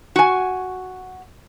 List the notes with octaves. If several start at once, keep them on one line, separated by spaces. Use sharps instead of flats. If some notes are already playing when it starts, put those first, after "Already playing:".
F#4 G#5